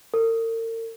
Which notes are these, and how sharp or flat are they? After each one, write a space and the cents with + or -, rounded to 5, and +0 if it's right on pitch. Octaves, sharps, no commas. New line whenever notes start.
A#4 -45